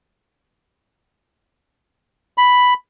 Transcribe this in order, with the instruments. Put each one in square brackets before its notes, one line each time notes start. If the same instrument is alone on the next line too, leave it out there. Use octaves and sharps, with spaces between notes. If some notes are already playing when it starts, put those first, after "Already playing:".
[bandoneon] B5